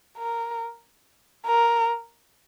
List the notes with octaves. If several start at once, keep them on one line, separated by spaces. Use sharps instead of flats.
A#4
A#4